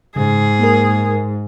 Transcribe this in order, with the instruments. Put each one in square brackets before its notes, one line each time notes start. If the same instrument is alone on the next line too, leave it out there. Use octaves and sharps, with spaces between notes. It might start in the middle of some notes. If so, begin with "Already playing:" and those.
[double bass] G#2 [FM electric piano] C#3 [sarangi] G#4
[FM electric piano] A#3 A#4